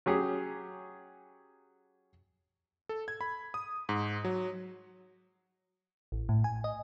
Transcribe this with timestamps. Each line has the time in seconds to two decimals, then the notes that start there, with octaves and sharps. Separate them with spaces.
0.06 F#3 C#4 G4 G#4
2.89 A4
3.08 G#6
3.21 B5
3.54 D#6
3.89 G#2
4.25 F#3
6.12 A1
6.29 A2
6.44 G#5
6.64 D#5